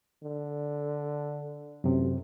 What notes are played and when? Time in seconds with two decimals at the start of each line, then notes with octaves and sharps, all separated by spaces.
0.24 D3
1.84 A1 F#2 C3